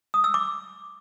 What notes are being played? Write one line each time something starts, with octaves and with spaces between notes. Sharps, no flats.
D#6
E6
D6